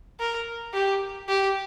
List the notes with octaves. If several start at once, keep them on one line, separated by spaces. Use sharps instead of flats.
A#4
G4
G4